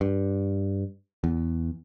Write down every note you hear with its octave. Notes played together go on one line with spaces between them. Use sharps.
G2
E2